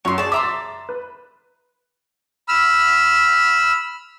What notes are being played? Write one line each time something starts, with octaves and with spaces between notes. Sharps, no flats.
F#2 C#5 C6
G#4 D5 A5
E5 A#5 C6 D6
A6
B4
B5 E6 F6